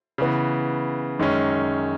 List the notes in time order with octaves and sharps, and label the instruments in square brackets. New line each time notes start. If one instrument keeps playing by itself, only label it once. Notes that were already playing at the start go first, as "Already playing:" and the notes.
[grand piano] C#3 E3 B3
F#2 D#3 G#3 C#4